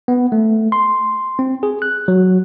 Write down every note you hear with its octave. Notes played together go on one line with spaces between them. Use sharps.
B3
A3
C6
C4
G#4
F#6
F#3